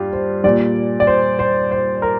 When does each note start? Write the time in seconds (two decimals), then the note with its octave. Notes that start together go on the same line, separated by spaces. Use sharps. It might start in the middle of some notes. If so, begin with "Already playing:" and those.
Already playing: G2 F4 G4
0.13 C5
0.44 A#2 G3 D5
1.00 D5
1.07 C5
1.39 C5
1.71 C5
2.02 A#4